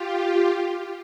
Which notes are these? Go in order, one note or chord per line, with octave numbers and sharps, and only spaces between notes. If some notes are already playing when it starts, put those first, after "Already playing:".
Already playing: F4 G4